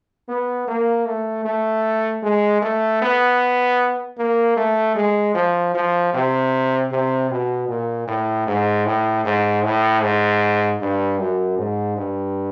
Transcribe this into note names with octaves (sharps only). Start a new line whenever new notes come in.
B3
A#3
A3
A3
G#3
A3
B3
A#3
A3
G#3
F3
F3
C3
C3
B2
A#2
A2
G#2
A2
G#2
A2
G#2
G2
F#2
G#2
G2